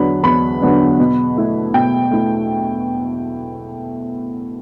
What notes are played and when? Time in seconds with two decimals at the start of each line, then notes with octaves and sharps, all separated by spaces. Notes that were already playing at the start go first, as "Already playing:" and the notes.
Already playing: E2 D3 F#3 B3 D4 B5
0.23 E2 B5
0.62 D3 F#3 B3 D4
0.99 B2
1.36 A3 E4
1.74 B2 G5
2.11 A3 E4